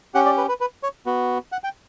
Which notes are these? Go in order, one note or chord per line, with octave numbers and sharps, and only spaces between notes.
C#4 G4 F#5
D5
B4
B4
B4
C#5
B3 F#4
F#5
G5